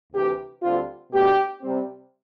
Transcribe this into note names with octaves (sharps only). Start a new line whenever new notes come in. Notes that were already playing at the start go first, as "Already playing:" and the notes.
D2 C3 E3 G4
D2 D3 G3 C4 F4
B2 A3 D4 G4
C3 G3 C4